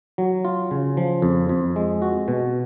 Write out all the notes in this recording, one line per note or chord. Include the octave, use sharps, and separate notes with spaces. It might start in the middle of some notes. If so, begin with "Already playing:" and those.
F#3
F4
C#3
F3
F2
F2
G#3
F#4
B2